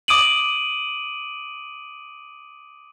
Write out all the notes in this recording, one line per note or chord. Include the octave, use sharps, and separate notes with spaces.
D6 D#6 D7 D#7 F#7